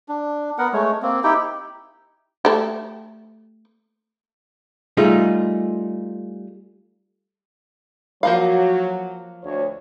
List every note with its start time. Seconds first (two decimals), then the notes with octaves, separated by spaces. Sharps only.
0.08 D4
0.58 B3 A#4 F#5
0.73 G#3 A3 C#5
1.02 A#3 C4
1.24 D#4 E4 G4 G5
2.45 A3 G4
4.97 G3 A3 D#4 F4 G#4
8.23 F3 F#3 A#3 F5
9.43 D2 C#5